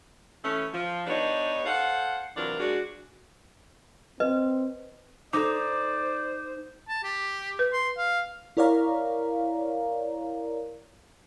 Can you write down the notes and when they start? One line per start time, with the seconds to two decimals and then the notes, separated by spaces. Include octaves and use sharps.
0.44 E3 A3 C#4
0.74 F3
1.07 B3 D4 D#4 G4 B4 C#5
1.66 A4 C5 F5 F#5
2.36 C3 E3 F#3 D4 F4 A#4
2.60 G#3 D4 F#4
4.20 C4 B4 D#5
5.33 D#4 A4 C5 D5 D6
6.88 A5
7.04 G4
7.59 B4
7.73 C6
7.98 F5
8.57 E4 A#4 C#5 D5 F5 A#5